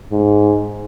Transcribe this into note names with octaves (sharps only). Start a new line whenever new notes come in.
G#2